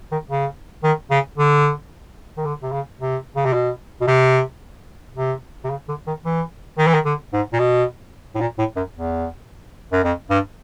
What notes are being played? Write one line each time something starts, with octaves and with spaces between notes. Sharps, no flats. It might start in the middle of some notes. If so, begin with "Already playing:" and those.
D#3
C#3
D#3
C#3
D3
D#3
D3
C3
C#3
C3
C#3
C3
B2
B2
C3
C3
C3
C#3
D3
D#3
E3
D#3
E3
D#3
D3
G#2
A#2
B2
A2
A#2
A2
F#2
E2
F#2
F2
G2